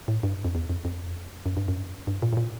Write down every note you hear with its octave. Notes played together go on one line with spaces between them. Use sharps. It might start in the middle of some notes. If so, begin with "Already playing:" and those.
A2
G2
F2
E2
F2
F2
F#2
G2
F#2
G2
A#2
A2
A#2